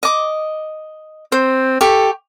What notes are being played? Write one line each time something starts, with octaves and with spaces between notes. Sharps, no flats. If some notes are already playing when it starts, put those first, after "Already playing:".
D#5 D6
C4 C5
G4 A4 C#6